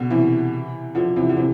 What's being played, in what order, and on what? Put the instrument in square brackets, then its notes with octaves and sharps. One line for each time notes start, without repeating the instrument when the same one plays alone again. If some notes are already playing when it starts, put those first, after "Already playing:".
Already playing: [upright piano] B2 D3
C3 E3
D3 F3
C3 E3
D3
C3 E3